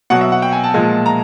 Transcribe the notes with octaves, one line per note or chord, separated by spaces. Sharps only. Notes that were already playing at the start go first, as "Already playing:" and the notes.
B2 F#3 F#5
E5
F#5
G5
G#5
A5
A#2 F3 G#3
A#5